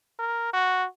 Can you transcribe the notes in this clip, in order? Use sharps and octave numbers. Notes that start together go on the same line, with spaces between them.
A#4
F#4